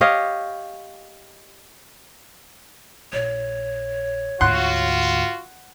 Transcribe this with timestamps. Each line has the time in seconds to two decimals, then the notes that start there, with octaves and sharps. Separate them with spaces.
0.01 G4 C#5 D#5 F5
3.13 A#1 C#5
4.41 D2 G#2 F4 F#4 F#5 C6 F#6